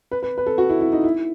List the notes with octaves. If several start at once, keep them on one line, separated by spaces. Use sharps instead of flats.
B4
B4
B4
A4
F#4
E4
E4
D#4
E4